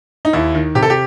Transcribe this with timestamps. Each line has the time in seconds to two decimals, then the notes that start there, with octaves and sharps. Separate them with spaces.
0.25 D#4
0.33 D#2 E4
0.55 D#3
0.75 C3 G4
0.82 A4
0.90 G4